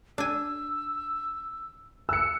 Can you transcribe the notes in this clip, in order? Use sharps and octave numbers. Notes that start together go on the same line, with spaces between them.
D4 G#5 E6
E6 F#6 C#7